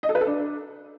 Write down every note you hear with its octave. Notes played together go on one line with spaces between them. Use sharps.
D#5
A4
B4
A4
D4